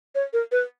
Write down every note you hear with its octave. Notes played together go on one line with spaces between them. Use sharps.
C#5
A#4
B4